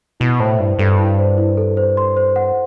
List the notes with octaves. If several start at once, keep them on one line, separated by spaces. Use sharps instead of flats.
B2 E4
A2 C5
G2 E4
G2 A4
E4
C5
E4
A4
C5
C6
C5
F#5